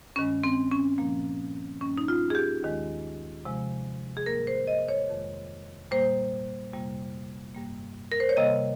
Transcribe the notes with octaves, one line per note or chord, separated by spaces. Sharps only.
G2 D#3 G#3 C#4
C4
C#4
A#2 F3 A#3
G2 D#3 G3 A#3 C#4
D#4
F4
G#4
G4
D#2 D#3 G#3
C3 F3 G#3
G#4
G#2 G3 A#3 A#4
C5
D#5
C#5
F2 D#3 G#3
A#2 G3 A#3 C5
F2 C3 G3 A#3
G2 G3 A#3
A#4
C5
C#5
C3 D#3 G3 A#3 D#5